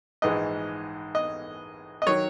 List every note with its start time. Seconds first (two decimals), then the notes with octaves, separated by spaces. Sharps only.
0.22 A#1 G#2 E3 G#3 D#5
1.15 D#5
2.02 D#5
2.07 D#3 F#3 C#5